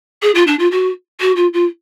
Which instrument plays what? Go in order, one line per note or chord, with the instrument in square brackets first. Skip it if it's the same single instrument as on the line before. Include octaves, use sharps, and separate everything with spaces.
[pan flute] G#4
F4
D4
F4
F#4
F#4
F4
F4